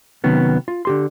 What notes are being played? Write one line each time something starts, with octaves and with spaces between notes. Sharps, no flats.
C3 D#3 F#3 B3 C#4
F4
D3 G4 C6